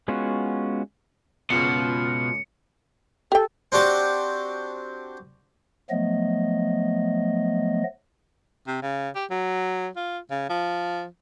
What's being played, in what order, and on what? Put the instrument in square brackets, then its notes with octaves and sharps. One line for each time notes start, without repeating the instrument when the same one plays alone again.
[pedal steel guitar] G#3 B3 C#4 F4 F#4
[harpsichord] C#2 F#2 [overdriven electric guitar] B2 [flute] F4 [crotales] C#7
[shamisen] G4 G5 [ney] A4
[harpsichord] C4 D4 F#4 G4 A5
[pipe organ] F3 F#3 A3 B3 D#5
[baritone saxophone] C3
C#3
G4
F#3
F4
C#3
F3